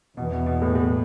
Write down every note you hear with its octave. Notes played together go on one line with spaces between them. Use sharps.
E2 B2 E3 B3
B2
B2
A2
A2